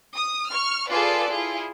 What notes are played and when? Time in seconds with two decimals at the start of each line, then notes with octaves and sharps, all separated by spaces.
0.16 D#6
0.50 C#6 F6
0.88 F4 G#4 A4 B4 D5
1.30 E4 F4 G#4